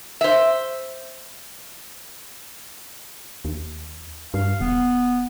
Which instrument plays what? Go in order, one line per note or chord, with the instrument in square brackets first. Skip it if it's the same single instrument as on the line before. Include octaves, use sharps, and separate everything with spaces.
[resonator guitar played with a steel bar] C5 E5
[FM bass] D#2
[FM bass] G2 [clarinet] F5
[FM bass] D#1 [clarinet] B3